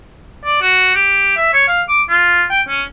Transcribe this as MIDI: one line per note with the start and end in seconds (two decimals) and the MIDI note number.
0.45 0.57 74
0.62 0.91 66
0.95 1.35 67
1.37 1.52 76
1.53 1.67 73
1.68 1.82 77
1.88 2.02 86
2.09 2.44 65
2.50 2.61 79
2.69 2.83 61